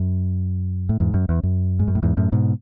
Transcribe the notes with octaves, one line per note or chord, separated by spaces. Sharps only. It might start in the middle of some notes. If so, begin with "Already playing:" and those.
Already playing: F#2
A2
E2 G#2
F#2
E2
F#2
G#2
F#2
A2
E2 G#2
F#2 A2
G#2 B2